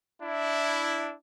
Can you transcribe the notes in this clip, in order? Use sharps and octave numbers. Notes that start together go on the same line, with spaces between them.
D4 E4